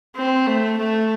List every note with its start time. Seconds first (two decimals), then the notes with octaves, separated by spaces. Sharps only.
0.16 C4
0.47 A3
0.78 A3